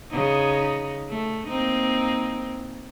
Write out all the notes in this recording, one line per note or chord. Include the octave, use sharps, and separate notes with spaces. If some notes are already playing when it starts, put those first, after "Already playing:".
C#3 D#4
A3
A#3 C4 D#4